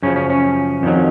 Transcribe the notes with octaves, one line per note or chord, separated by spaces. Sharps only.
F#2 C#3 F3 C#4
C#4
C#4
F2 D#3 F#3